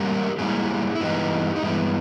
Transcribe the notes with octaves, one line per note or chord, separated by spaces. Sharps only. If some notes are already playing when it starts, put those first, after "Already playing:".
Already playing: G#2 G3 A#3 C#4 G4 A#4
G#2 G3 A#3 C#4 E4 G#4
E4
G2 E3 G#3 B3 D#4 G4
D#4
G2 E3 G#3 B3 E4